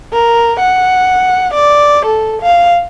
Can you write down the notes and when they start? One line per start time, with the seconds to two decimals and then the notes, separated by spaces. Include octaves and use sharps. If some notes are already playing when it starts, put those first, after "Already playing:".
0.13 A#4
0.60 F#5
1.54 D5
2.06 A4
2.42 F5